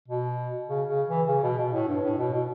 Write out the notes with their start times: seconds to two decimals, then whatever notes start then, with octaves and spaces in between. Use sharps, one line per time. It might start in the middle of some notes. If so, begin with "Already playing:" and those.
0.08 B2
0.68 C#3
0.88 C#3
1.09 E3
1.28 C#3
1.43 B2
1.58 B2
1.73 A2
1.88 G2
2.03 A2
2.18 B2
2.33 B2